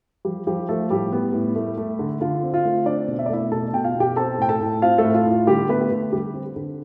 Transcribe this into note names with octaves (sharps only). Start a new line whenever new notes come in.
F3 G3 G4
F3 G3 G4
F3 A3 A4
A2 G3 G4
B3
A2
A3
A3
D3
D3 F4
C4
F4
A3
C4 D4 D5
B2
E5
D5
A3 E4 E5
B2 A4 A5
B2 G5
F4 F5
B2
G4 G5
C4 A4 A5
A2 G5
A4 A5
A2
C4 F4 F5
A3 A4
A2
F4
A2
F4
D3 G3 G4
A3 B3 B4
D3
D3 G3 G4
C4
D3